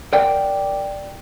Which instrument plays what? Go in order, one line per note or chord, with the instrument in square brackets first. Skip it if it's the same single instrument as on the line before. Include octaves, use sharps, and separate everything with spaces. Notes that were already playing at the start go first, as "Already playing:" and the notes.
[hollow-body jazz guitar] A#4 C5 D5 F#5 G5